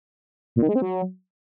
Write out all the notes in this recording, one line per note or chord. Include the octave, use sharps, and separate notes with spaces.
A#2
D#3
G#3
C4
F#3